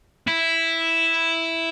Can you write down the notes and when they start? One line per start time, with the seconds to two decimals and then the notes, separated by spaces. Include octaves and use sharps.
0.27 E4